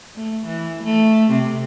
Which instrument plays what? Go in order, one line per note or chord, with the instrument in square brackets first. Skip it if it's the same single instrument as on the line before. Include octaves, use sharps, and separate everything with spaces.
[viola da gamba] A3
E3
A3
C3